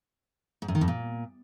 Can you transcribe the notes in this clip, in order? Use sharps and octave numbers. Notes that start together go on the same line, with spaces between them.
G#2
F#2
D#3
F2
A#2